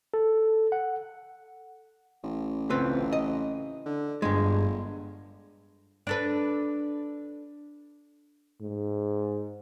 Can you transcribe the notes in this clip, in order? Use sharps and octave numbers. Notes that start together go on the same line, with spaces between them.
A4
F#5
A1
C#2 C4 B4
D#5
D3
G1 G2 G#3
D4 A4 B4
G#2